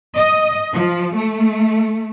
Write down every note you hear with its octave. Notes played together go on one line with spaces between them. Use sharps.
D#5
F3
A3